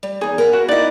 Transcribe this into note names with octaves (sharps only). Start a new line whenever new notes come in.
G3
E2 D#4 G#4
A#4 B4 F#5
F#4
D#4 E4 D5 D#5